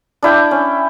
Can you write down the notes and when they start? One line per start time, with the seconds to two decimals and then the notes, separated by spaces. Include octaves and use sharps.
0.23 D4 E4 G5 D6
0.51 C#4